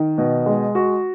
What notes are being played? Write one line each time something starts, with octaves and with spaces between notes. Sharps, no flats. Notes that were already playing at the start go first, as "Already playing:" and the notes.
Already playing: D#3
B2
G#3
F#4